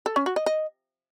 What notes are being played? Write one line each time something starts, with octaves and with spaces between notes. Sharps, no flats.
A4
C#4
F#4
D#5
D#5